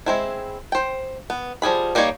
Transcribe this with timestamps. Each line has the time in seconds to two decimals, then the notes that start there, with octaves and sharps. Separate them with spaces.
0.06 G#3 C4 E4
0.72 C5 G5
1.30 B3
1.62 F3 G3 G#4 B5
1.95 G3 A#3 D#4 C#5 D5